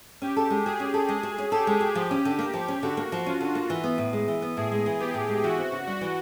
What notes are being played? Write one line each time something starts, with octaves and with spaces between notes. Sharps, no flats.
C#4 G4
A4
G#3
F#4 G#4
C#4
A4
G#3
F#4
C#4
G4 A4
G#3
F#4
F3 G4
C#4
D3
A#3
F3
C#4
D3 F#4
A#3
F3
C#4 F4
D3
A#3
E3
B3
A2
G#3
E3
B3
A2 G#4
G#3
E3
B3 G4
A2
G#3
E3 F#4
C4
C#3
G3 F#4
E3